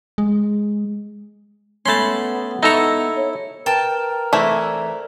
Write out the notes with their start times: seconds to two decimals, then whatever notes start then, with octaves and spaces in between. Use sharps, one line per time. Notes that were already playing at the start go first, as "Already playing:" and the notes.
0.18 G#3
1.86 A3 B3 C#4 A5 B5 C6
2.63 D#4 E4 A4 A#5 C#6
3.15 C#5
3.66 A#4 B4 G5 A5
4.33 E3 A3 C4 E4 C5 D5